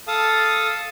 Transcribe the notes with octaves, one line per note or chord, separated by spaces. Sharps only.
A4 F5 A5 D#6